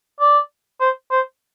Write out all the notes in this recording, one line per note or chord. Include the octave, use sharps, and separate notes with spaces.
D5
C5
C5